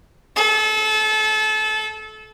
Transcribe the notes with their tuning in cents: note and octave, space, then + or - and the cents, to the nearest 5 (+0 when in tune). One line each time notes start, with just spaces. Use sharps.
A4 -30